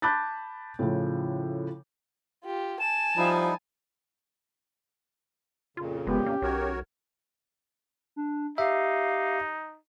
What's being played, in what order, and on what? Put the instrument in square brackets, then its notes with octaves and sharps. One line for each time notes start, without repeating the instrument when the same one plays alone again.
[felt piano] A5 B5 D6 F#6 G6 A6
A2 C#3 F3
[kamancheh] F4 G4
[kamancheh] G#5 A5 [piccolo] E7
[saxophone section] F3 [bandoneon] G3 D#4 E4
[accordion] F2 A#2 C#3 [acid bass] F4
[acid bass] F1 [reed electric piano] G#3 B3 [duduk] G4
[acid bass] A#3 [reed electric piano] C#4
[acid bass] B1 [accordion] F#4 A#4 C#5
[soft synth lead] D4
[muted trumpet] D#4 [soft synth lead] G4 [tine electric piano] E5 [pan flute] F5